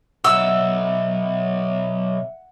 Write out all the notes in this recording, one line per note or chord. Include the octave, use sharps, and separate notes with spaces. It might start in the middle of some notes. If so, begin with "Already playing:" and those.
B1 E5 F#5 E6